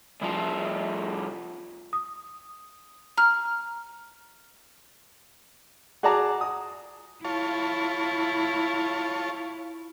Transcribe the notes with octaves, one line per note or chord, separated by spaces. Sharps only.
C2 F3
D#6
A#5 F6
F#4 G#4 D5 A5 A#5
D#6
E4 F4 C#5 A5